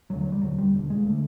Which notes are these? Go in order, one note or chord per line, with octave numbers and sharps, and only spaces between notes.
F1 D#2 D3 F#3
F#3
G3
E1 D#2 D3 F#3
G3
E1 D#2 D3
G#3
D3 A3